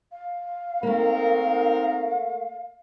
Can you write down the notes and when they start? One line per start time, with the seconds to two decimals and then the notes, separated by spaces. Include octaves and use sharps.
0.12 F5
0.83 A3 A#3 C4 D#4 A#4